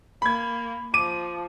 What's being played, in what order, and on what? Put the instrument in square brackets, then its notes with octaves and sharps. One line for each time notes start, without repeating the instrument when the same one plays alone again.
[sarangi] A#3 [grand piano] B5 G#6
[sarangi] F3 [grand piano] D6 D#7